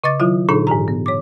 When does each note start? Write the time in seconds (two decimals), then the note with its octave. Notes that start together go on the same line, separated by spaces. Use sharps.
0.04 C#3 D#5 D6 A6
0.20 D#3 F#3 E4 F4
0.49 A#2 D3 D4 D#4 G#4 A4
0.67 G#2 E3 G4 A#5
0.88 B3
1.06 C#5 D6